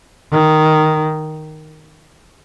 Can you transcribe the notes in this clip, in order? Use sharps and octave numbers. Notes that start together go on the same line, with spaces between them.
D#3